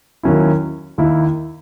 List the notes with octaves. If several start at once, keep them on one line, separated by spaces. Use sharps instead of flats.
D#2 D#3 F#3 C#4 E4
D#2 D#3 A#3 E4